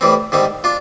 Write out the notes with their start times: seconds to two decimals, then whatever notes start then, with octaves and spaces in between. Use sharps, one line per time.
0.01 A2 E3 G3 C4
0.32 G#2 D#3 G3 C4
0.64 D4 F4